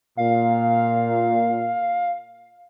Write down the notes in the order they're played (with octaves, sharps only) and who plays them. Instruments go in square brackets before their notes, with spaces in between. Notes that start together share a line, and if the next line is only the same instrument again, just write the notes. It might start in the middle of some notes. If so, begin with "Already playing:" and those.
[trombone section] A#2 [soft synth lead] F5